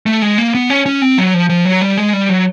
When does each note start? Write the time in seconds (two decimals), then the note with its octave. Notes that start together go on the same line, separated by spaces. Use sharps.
0.06 A3
0.22 G#3
0.38 A#3
0.55 B3
0.70 C#4
0.86 C#4
1.02 C4
1.18 F#3
1.34 F3
1.49 F3
1.65 F#3
1.82 G3
1.97 G#3
2.13 G3
2.29 F#3